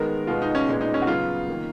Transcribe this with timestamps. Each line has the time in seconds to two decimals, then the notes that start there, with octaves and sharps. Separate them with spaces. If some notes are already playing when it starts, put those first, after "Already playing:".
Already playing: D#3 G#3 B3 A#4
0.27 B2 G#3 B3 F4
0.42 D#4
0.55 C#4
0.68 A#2 G#3 B3
0.81 D#4
0.94 C#4
1.02 F#4
1.07 C#3 F#3 B3 F4
1.48 D#3 A#3